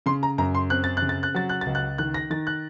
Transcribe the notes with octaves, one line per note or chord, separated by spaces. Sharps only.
C#3 C6
A#5
F#2 A#5
C6
C4 F#6
A6
F#6
C#3
A6
F#6
F#3 A6
F#6
C#2 A6
F#6
D#3 F#6
A#6
D#3 A6
F#6